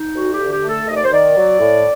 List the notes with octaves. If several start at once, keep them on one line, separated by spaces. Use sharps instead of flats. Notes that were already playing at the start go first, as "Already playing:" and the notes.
Already playing: D#4
D2 F#4
G4
D3
G4
A3
A4
D#2 D#5
D5
C5
D#3 D5
F#3
A2